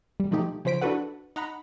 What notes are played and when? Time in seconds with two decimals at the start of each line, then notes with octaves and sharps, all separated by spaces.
0.20 G3
0.31 B2 F3 A3 D#4 G4
0.65 C#3 F3 C5 B6 D7
0.82 D4 E4 F#4 A4 B4 F#5
1.36 D#4 F#5 A#5 B5